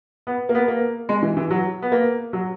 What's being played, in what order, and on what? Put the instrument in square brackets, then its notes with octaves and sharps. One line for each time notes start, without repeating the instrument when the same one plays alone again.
[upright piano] B3
A#3
B3
A#3
G#3
E3
E3
F#3
B3
A#3
F#3